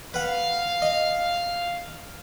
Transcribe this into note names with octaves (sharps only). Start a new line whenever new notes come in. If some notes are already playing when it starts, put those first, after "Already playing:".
B4 F5 F#5
D#5